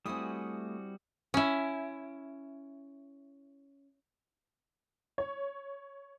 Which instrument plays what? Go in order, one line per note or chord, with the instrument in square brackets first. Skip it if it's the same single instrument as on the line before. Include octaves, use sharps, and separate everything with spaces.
[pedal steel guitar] G3 F#4 [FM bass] A3 [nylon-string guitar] C4 E4 [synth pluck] G#5 D#6
[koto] C#4 E4
[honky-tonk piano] C#5